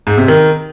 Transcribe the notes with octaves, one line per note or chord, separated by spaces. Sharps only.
G#2
C3
D#3